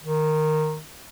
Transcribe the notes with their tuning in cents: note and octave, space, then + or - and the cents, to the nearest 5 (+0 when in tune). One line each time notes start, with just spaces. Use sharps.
D#3 -10